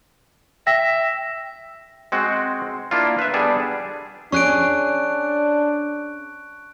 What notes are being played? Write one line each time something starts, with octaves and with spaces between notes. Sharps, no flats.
E5 G5 A#6
G#3 C4 F#4
A#3 D4 E4 F4
B4 E5
G3 B3 D4 G#4 A4
C#4 D4 G#4 C#6 F#6 D7